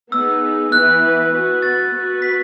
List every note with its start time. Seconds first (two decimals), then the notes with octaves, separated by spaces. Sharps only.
0.12 B3 D#4 G#4 E6
0.72 E3 B3 E4 B4 F#6
1.32 B3 F#4 B4
1.62 A6
1.93 B3 F#4 B4
2.22 B6